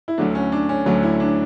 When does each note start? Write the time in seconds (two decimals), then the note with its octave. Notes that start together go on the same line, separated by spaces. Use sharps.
0.08 E4
0.18 D2 D3 F#3 A3 D4
0.35 C#4
0.52 D4
0.69 C#4
0.86 D2 D3 F#3 A3
1.03 E4
1.20 D4